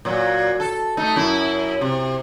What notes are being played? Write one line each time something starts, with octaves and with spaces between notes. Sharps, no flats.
A#2 F#3
A4
A3 D#4
F#2 E4
C3